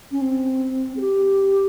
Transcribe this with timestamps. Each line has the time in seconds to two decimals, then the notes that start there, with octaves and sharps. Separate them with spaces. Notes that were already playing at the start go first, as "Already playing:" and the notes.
0.11 C#4
0.21 C4
0.97 G#4
1.01 G4